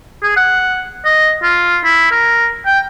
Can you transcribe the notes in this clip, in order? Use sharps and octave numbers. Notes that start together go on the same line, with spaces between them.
G#4
F#5
D#5
F4
E4
A#4
G5